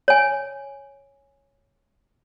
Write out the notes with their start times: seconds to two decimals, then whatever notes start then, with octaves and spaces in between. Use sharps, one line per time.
0.08 C#5 G#5